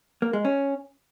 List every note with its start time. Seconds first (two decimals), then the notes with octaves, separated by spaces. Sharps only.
0.22 A#3
0.33 G#3
0.45 C#4